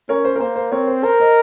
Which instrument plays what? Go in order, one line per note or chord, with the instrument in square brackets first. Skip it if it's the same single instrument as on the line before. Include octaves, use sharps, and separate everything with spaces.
[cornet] C#4 [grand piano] A#4 C#5
[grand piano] C5
A#4
[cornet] A#3 [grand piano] C5
[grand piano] C5
[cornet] C4 [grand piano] A#4 C#5
[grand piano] C5
[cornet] A#4 [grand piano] C5
[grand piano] C5 D#5